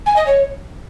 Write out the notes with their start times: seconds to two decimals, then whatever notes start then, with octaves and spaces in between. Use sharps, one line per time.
0.06 G#5
0.16 D#5
0.26 C#5